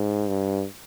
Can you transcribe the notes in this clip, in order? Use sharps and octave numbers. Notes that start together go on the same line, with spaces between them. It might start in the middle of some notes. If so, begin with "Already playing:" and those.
Already playing: G#2
G2